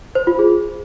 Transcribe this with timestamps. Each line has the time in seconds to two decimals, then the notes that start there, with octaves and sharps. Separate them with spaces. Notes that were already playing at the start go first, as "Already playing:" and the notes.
0.15 C5
0.27 F4
0.39 G#4